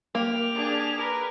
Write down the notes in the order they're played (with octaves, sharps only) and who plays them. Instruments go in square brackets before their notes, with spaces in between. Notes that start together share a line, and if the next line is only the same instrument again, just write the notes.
[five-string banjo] A#3 [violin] G4 F7
[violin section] D4 G#4
A#4 B4